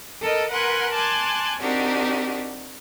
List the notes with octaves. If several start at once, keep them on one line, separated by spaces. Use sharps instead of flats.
A4 A#4 D#5
A#4 B4 F#5 G#5 C6 F#6
G#5 A5 C6 D6 F#6
C4 D4 D#4 F#4 G4 A#4